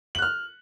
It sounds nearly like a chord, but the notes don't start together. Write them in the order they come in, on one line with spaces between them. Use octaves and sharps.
F#7 F#6 F6